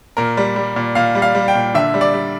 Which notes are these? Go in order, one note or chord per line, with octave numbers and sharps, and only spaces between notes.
A#2 A#4
G3
G3
A#2
A#2 F5
G3
F5
G3
G5
A#2
D3 E5
G3
D5
G3